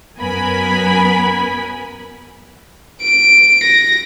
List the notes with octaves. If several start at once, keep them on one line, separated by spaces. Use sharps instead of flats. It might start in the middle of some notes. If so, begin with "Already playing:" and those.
F#2 F#3 B3 A#4 G#5 B5
D7
A#6